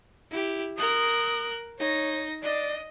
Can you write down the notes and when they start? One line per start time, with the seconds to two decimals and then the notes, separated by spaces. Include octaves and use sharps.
0.31 E4 G4
0.78 A#4 D#6 F#6
1.79 D#4 C#5 A#6
2.43 D5 D#5